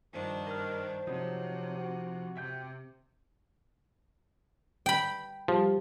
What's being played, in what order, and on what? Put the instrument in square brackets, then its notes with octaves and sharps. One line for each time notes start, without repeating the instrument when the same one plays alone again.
[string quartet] G2 D#3 D4 [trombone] F3 [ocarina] C5
[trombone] A#4 [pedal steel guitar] D#5 F6
[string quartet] C3 [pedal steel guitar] F3 D#4 [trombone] F#3
[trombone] F#4
[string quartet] C3 [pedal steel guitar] E5 G5 G6
[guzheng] G5 B5
[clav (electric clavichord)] F3 [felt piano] G3